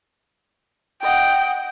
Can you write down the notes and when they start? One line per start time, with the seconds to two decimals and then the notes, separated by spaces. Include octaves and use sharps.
1.03 D#5 F#5 G5